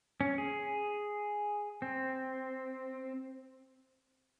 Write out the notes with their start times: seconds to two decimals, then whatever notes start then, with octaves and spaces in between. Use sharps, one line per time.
0.21 C#4
0.38 G#4
1.82 C4